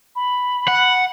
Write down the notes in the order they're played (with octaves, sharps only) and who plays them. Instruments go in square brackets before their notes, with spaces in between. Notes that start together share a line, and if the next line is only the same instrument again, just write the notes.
[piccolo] B5
[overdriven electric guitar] F#5